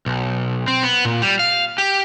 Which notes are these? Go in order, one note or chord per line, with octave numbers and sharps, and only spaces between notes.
B1
C4
B3
A#2
G3
F5
G4